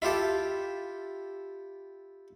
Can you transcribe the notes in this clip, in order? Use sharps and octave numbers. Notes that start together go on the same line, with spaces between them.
E4 F4 G4 A4